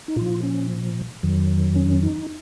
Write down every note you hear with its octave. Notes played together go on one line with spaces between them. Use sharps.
D#4
A#2 F3 F4
C#4
F2 D#3 F#3
C#4
D#4